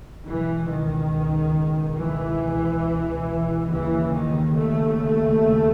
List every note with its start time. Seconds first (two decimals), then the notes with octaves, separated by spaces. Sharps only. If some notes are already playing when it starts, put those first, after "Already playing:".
0.25 C#2 B2 E3
0.68 D#3
1.97 E3
3.70 D#2 C#3 E3
4.13 D#3
4.56 A3